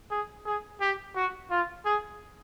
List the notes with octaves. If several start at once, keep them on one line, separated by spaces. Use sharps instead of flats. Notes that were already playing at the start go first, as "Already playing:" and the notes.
G#4
G#4
G4
F#4
F4
G#4